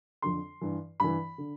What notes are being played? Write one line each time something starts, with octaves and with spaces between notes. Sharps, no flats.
F2 D3 C6
G2 E3
G2 E3 B5
D3